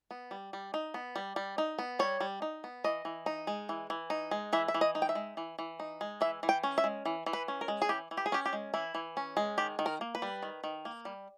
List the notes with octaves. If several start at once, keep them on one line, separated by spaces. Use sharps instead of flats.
B3
G3
G3
D#4
B3
G3
G3
D#4
B3
G3 C#5
G3
D#4
B3
E3 D#5
E3
D#4
G#3
E3
E3
D#4
G#3
E3 E5
E5
E3
D#5
D#4
G5
E5
G#3
E3
E3
D#4
G#3
E3 E5
E3
G5
C#4
E5
G#3
E3
E3
B4
C#4
A#4
G#3
G#4
E3 G4
E3
G4
G#4
C#4 G4
G4
G#3
E3 E4
E3
C#4
G#3
D#3 G4
D#3
A#4
A#3
B4
G3
D#3
D#3
A#3
G3